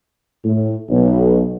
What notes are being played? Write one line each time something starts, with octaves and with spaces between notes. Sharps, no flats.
A2
B1